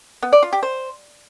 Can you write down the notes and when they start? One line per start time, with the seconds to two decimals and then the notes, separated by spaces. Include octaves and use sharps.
0.22 B3
0.33 D5
0.43 F4
0.53 G4
0.63 C5